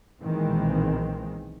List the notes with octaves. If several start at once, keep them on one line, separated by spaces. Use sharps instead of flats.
B1 A#2 D#3 E3 G#3 C4